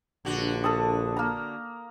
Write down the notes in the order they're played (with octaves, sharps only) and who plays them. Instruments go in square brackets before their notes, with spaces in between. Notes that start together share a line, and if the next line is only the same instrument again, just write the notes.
[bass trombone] A#1 [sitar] D3 F#4
[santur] A4 A5 D#6
A#3 A#5